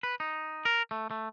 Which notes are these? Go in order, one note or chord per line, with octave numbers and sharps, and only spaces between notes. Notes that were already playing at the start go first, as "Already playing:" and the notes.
B4
D#4
A#4
A3
A3